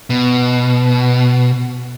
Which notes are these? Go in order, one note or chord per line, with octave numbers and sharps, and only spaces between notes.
B2